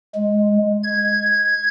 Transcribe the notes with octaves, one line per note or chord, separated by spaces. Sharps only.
G#3
G#6